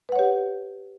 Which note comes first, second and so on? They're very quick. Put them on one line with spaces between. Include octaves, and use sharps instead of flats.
B4 F#5 C#5 G4